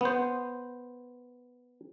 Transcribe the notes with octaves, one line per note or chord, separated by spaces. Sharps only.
B3 C5